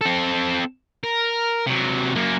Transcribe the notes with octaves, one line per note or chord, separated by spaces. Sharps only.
C4 A4
A#4
C3 F#3
F#2 A#3